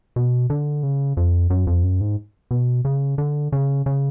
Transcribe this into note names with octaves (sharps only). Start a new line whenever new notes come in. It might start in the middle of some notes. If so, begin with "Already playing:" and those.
B2
D3
C#3
F2
F#2
F2
F#2
G#2
B2
C#3
D3
C#3
C#3